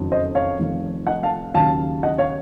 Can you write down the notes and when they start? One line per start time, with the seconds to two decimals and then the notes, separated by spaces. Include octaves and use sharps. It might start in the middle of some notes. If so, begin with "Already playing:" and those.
Already playing: F#1 F2 D#3 F#3
0.12 C5 D#5
0.35 C#5 F5
0.59 F1 F2 D#3
1.07 D#5 F#5
1.23 F5 A5
1.54 D#2 C#3 F#3 F5 A5
2.03 D#5 F#5
2.18 C#5 F5